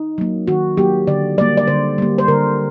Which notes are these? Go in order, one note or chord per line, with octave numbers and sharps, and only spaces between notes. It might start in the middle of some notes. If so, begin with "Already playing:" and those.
Already playing: D#4
F#3 A#3
D#3 F#4
F#3 A#3 G4
D3 D5
G3 A#3 D5
D5
D3 C5
G3 A#3
C5
D3 A#4